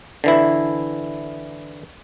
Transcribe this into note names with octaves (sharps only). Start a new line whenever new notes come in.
D3 E3 E4